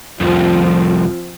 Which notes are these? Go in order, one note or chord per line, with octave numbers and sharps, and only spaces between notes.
C2 F2 F3 C4 F4